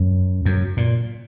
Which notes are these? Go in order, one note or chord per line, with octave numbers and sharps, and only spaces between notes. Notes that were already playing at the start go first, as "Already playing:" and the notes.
Already playing: F#2
F#2
A#2